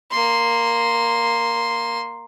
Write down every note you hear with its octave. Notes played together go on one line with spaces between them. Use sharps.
A#3 C6